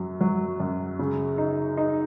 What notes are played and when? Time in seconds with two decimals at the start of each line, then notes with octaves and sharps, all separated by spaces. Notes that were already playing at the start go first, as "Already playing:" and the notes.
Already playing: F#2 F#3
0.21 F#3
0.60 F#2
0.99 C#3
1.38 D#4
1.77 D#4